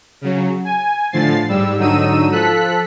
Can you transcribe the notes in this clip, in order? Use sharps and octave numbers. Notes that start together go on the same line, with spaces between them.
C#3 F#3
G#5
A2 D3 F3 A6 C7
G#2 G3 E6
G#2 D3 F#3 D#4 E6 D#7
F3 A4 F#6 B6